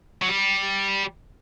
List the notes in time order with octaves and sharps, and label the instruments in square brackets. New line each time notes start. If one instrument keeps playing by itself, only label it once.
[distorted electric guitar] F#3
G3